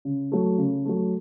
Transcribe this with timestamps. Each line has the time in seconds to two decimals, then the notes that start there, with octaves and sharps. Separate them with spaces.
0.05 C#3
0.32 F#3 A3
0.58 C#3
0.85 F#3 A3